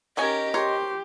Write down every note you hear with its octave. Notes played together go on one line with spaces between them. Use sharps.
D#3 C#4 G4 A#4 C#5 D#5 G#5
G4 A#4 C5 C#5 C6